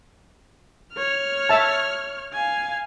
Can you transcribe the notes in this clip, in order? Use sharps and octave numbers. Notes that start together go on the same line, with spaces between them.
C#5 F6
E5 A5
F5 G#5